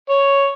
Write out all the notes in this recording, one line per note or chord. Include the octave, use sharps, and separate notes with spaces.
C#5